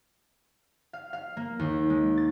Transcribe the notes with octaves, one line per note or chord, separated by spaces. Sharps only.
F5
F5
A#3
D#2
G#3
A6